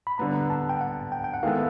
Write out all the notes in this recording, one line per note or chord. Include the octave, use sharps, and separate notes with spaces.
B5
D3 G3 B3 A#5
A5
G5
F#5
G5
G5
F#5
D#3 G#3 B3 E4 A4 F5